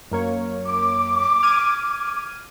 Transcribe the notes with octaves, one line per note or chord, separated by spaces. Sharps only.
F#2 A#3 C#5
D6
F6 G#6 D#7